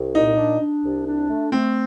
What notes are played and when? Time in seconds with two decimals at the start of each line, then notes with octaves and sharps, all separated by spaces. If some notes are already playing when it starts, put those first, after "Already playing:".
Already playing: C2
0.15 A#2 D#4
0.37 D4
0.60 D4
0.83 C2
1.07 D4
1.29 A3
1.52 A3 C4